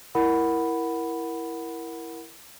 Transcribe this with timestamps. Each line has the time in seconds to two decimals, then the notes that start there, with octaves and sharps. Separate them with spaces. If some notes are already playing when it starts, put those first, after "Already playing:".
0.15 E4 A#4 F#5 B5